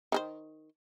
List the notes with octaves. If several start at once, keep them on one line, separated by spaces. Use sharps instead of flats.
D#3 G#4 C5